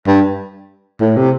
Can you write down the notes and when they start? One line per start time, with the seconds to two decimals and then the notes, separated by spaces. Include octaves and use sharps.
0.07 G2
1.01 A2
1.16 C3